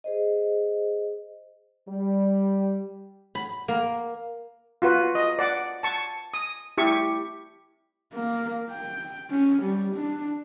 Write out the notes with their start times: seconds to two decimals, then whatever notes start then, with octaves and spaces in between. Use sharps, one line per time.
0.04 G#4 C5 D#5
1.89 G3
3.35 B5
3.68 A#3
4.82 F4 F#4 B4
5.15 D#5
5.39 D5 F#5
5.83 A5 C#6
6.34 D#6
6.78 E4 G4 C#6
8.13 A#3
8.70 G5
9.31 C#4
9.63 G3
9.96 D4